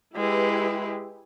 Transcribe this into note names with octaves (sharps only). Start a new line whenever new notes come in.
G#3 E4 G4 B4